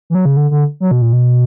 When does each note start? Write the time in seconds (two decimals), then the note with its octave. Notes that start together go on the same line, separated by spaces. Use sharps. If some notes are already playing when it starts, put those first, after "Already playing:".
0.10 E3
0.15 F#3
0.25 C#3
0.37 D3
0.51 D3
0.80 F#3
0.91 B2
1.02 A#2
1.13 B2